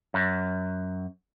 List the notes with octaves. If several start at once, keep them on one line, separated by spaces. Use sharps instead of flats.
F#2